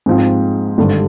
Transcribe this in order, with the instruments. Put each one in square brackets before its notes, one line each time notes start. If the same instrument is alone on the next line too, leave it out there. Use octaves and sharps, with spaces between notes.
[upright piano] G#2 F3 C4
G#1 G2 D3